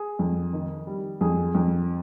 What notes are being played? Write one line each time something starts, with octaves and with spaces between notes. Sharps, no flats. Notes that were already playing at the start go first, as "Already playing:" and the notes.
Already playing: G#4
F2
D#3
G3
F2 G#4
F2